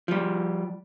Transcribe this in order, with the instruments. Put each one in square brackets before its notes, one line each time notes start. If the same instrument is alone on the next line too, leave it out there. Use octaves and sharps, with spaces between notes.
[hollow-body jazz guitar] F3 G3